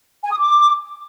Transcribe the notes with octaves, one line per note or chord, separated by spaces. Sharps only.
G#5
D#6
D6